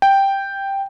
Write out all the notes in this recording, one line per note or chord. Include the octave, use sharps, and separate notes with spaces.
G5